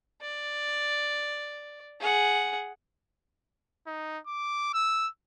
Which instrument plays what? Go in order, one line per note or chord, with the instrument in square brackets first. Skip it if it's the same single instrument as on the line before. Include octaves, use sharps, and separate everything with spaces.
[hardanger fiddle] D5
G#4 F#5
[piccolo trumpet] D#4
D6
E6